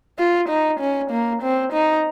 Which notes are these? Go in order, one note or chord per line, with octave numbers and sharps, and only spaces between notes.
F4
D#4
C#4
A#3
C4
D#4